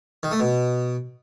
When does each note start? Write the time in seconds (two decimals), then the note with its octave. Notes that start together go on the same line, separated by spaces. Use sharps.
0.23 D#3
0.31 A3
0.40 B2